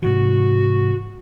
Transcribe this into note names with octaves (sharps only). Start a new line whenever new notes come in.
G#2 C3 E3 F#4